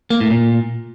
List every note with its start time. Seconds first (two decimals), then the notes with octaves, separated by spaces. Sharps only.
0.10 A#3
0.20 A2
0.31 A#2